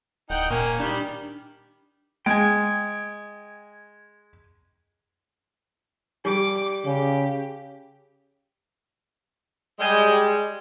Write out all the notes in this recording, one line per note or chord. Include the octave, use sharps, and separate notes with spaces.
D1 D#4 F#5 G5
A#2 A#3 C#4 A#4
D#3 G3 D4
G#3 G5 G#5
G3 D6
C#3 G4
G3 G#3